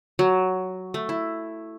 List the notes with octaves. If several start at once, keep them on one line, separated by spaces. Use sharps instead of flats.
F#3
A3
E4